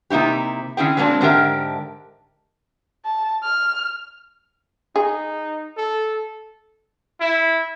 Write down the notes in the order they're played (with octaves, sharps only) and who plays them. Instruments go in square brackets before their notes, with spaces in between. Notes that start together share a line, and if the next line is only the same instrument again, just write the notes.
[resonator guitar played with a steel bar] C3 A#3 D#4 E4 G4
D3 C#4 E4 G#4 G5
F#3 G#3 A#3 C4 D4
G#2 D3 D4 G4 A#4 E5
[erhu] A5
F6
[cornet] D#4 [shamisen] G#4
[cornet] A4
[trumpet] E4